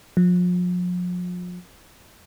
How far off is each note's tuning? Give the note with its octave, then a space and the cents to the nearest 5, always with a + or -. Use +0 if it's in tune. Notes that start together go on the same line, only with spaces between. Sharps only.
F3 +40